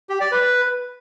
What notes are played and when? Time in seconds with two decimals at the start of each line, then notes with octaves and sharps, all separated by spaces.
0.09 G4
0.20 D5
0.31 B4